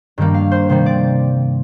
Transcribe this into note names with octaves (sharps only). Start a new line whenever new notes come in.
G2 D#3 G3 A#3
F5
C5
C3 D#3 G3 C5
D5